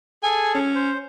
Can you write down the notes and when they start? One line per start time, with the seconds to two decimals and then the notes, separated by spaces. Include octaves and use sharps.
0.23 G#4 A4 G#5
0.55 C#4
0.75 C5